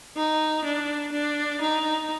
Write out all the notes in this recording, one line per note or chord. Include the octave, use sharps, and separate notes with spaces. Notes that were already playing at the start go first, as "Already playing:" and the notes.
D#4
D4
D4
D#4